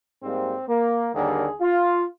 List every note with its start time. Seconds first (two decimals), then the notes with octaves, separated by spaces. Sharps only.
0.23 G#2 G3 A#3 C4
0.68 A#3
1.14 D#2 D3 G3 A#3 G#4
1.61 F4